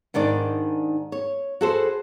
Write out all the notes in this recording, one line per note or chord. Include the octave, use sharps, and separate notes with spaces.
G#2 D#3 D4 D5
C#5
F#4 G#4 A4 B4 C5